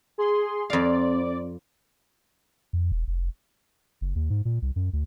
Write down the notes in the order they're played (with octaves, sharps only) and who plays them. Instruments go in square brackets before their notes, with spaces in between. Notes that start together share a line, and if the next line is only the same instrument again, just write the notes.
[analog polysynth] G#4 C6
[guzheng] F2 F5 [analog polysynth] D5
[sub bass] F2
E1
F1
F#1
D#2
G#2
A#2
C2
F#2
D2